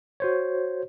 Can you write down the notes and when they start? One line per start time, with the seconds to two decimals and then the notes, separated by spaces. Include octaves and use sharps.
0.20 F#4 C5 C#5